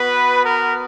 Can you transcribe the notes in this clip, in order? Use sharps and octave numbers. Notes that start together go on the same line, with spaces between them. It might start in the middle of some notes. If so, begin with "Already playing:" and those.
Already playing: B3 F#4 B4
A#4